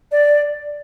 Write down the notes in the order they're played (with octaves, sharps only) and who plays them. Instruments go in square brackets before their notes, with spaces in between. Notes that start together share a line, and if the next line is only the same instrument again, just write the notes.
[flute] D5